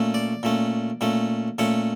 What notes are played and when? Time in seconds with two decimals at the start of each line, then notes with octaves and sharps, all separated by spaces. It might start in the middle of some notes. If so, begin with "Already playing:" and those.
Already playing: A#2 A3 C#4
0.14 D5
0.43 A#2 A3 C#4
1.01 A#2 A3 C#4
1.58 A#2 A3 C#4 C#5